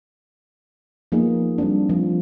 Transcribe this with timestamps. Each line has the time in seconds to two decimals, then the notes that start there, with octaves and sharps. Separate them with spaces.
1.12 F3 A#3 B3 D#4 G#4
1.58 G3 C4 D4
1.89 F3